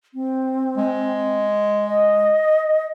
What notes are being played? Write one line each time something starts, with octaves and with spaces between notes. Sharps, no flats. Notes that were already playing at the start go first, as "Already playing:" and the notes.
C4
G#3
D#5